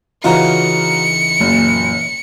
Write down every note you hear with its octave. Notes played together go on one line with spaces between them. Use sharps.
C#3 E3 D#4 F4 F#4 A#5 C#7
F#1 A#2